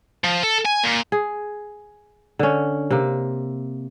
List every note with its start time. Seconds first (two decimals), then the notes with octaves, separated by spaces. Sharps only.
0.24 F3
0.43 A4
0.66 G#5
0.84 A#2
1.12 G#4
2.39 D3 C#4
2.90 C3 A#3